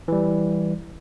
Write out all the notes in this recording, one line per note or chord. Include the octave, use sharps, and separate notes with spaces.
E3 G3